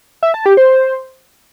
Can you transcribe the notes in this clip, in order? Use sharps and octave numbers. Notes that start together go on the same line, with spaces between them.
E5
A5
G4
C5